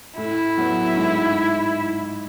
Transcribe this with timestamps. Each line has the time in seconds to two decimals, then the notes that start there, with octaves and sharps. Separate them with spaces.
0.17 A2 E4
0.58 F#3 B3
0.97 G#2